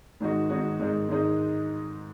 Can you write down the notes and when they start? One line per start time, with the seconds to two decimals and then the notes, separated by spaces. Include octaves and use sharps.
0.20 G#2 D#3 G#3 D#4 F#4
0.50 G#2 D#3 G#3 D#4 F#4
0.80 G#2 D#3 G#3 D#4
1.09 G#2 D#3 G#3 D#4